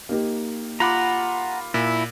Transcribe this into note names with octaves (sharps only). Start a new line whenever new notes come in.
A#3 D#4 G4
F4 F#5 A#5 B5 D6
A#2 E4